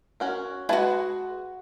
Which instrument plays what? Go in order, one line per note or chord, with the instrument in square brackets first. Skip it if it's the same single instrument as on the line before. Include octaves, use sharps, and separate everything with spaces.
[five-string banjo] C#4 F#4 A#4
[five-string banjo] G#3 B4 A5 [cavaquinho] E4 F#4